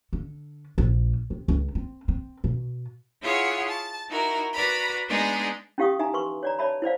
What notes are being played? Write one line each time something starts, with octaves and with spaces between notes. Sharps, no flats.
D3
A#1
C3
C#2
C4
C4
B2
E4 F4 G#4 C#5 F#5
A5
D#4 E4 F#4 A#4
F#4 B4 D5 A#5 B5
G#3 B3 D4 D#4 G#4
C#4 E4 G4 F5 C#6 D#6
D#4 E5 G#5 A#5
B4 C6 C#6
C#5 D5 A#5
C#5 D5 E5 A5 B5
E4 C5 D5 F5